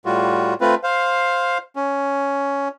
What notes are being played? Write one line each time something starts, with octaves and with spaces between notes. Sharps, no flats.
A2 G3 F4 F#4
A3 C4 F4 B4
C5 F5
C#4